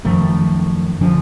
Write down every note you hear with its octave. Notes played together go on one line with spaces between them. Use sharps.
F#2 D#3 F3 A3
D3 F3 C#4 D4